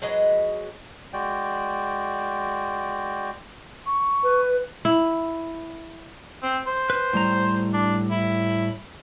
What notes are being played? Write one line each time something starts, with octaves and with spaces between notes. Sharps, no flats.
F#3 G#3 B4 D#5
G#3 F#4 D5 G5
C#6
B4
E4
C4
C5
B4
A2 G3 A#5
D4
E4